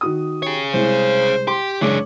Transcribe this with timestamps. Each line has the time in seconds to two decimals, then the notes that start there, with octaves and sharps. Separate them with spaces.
0.01 D#3 F#4 D#6
0.43 G4 G#4 C#5
0.73 C2 G#3 C5
1.48 G4 C6
1.81 F#1 E3 G#3 D4 C#5 D6